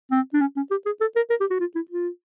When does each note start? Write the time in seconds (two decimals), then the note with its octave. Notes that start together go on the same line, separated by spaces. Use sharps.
0.11 C4
0.33 D4
0.41 C#4
0.57 C#4
0.71 G4
0.86 G#4
1.01 A4
1.16 A#4
1.30 A#4
1.40 G4
1.50 F#4
1.60 F4
1.75 E4
1.91 F4